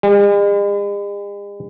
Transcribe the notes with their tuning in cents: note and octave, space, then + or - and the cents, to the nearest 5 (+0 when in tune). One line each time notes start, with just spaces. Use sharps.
G#3 -45